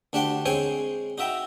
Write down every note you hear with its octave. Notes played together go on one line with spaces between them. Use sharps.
D2 D4 G4 F#5 G5 C6
G#3 C4 C5 C#5 G5 G#5
D#4 F#4 E5 G5 A#5